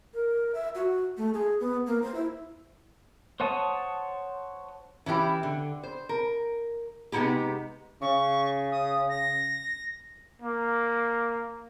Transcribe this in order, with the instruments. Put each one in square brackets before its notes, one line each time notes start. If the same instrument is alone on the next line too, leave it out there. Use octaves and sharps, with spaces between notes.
[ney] A#4
E5
F#4
A3
G#4
B3
A#3
C5
E4
[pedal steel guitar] C5 C#5 F#5 A5 D#6
[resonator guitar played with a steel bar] E3 C#4 E4 G4
D3
C5
A#4
C3 G#3 B3 D#4 E4 G4
[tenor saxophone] C#3 [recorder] C#6
[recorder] D#6
A#6
[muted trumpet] A#3